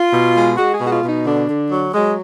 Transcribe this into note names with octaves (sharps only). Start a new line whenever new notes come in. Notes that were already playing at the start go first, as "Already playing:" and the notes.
Already playing: F4
B2
G#3
G#3 F#4
G#4
B2
F#4
F4
B2
D#4
D3 D4
D3
F#3
F#3 G#3